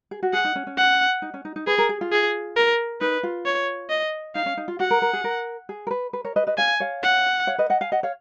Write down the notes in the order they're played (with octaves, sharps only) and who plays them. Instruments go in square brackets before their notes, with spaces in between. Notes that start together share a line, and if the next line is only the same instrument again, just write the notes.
[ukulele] G#4
F#4
[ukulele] G#4 [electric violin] F#5
[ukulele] D#4
C#4
C#4
[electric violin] F#5
[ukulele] D#4
C#4
D#4
D#4
[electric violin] G#4 [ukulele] B4
[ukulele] A#4
G#4
F4
[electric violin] G#4
A#4
[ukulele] D#4 [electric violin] B4
[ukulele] F4
[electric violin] C#5
D#5
[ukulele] D#4 [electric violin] F5
[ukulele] C#4
D#4
F4
[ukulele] F#4 [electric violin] F#5
[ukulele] A#4
A#4
G#4
A#4
G#4
A#4
B4
B4
A#4 C#5
B4 D#5
B4 D#5
[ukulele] C#5 F5 [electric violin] G#5
[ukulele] C#5 F5
[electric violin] F#5
[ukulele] C#5 F5
B4 D#5
D#5 F#5
F5 G#5
D#5 F#5
C#5 F5